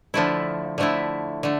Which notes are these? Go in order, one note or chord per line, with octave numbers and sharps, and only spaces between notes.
D3 F3 A3 E4
D3 F3 A3 E4
D3 A3